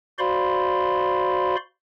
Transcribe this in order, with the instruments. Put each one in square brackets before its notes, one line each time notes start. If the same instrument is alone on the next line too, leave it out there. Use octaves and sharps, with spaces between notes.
[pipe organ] F#4 C5 D5 F5 B5 C6